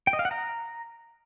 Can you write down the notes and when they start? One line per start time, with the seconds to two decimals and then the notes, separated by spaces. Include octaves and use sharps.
0.07 G5
0.13 D#5
0.19 F5
0.25 F#5
0.31 A#5